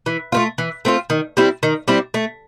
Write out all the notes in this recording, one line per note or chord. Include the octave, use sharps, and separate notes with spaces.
E3
A3 C4 F4
E3
A3 C4 F4
D#3
G3 C4 E4
D#3
G3 C4 E4
A3